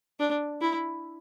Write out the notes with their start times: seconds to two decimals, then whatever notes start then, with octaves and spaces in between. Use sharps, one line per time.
0.20 D4
0.61 E4